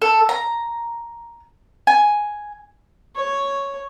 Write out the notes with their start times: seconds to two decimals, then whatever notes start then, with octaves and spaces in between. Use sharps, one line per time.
0.02 A4
0.29 A#5
1.87 G#5
3.15 C#5